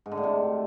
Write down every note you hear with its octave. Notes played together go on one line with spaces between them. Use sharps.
G#2
D3
A2
C3